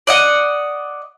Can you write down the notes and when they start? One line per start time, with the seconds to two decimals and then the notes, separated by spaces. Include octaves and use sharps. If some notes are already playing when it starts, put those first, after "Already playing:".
0.07 D5 D#5 F#5